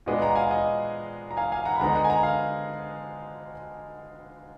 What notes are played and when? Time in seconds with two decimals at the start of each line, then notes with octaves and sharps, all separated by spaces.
0.06 A#2 G#3 B3 D4 F4 D#5
0.22 F#5 A#5
0.35 F5 G#5
0.50 D#5 F#5
1.31 A#5
1.37 F5 G#5
1.52 F5 G#5
1.65 F#5 A#5
1.76 B5
1.80 D3 G#3 B3 D#4 F#5 A#5
1.96 F#5 A#5
2.05 G#5
2.09 F#5 A#5
2.23 F5 G#5